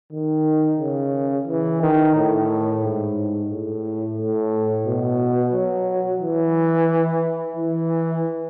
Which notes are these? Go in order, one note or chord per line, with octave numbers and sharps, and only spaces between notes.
D#3
C#3
E3
D#3
A2
G#2
A2
A2
B2
F#3
E3
E3